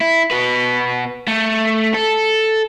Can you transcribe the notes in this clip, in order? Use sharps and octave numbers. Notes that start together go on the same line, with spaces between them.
E4
B2 B4
A3
A4